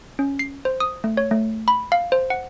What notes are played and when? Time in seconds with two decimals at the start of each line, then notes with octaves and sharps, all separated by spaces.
0.19 C#4
0.39 C7
0.65 C5
0.80 D#6
1.04 A3
1.17 C#5
1.31 A3
1.68 B5
1.92 F5
2.12 C5
2.30 F#5